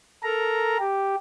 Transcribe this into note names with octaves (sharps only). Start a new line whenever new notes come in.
A4 A#4 A#5
G4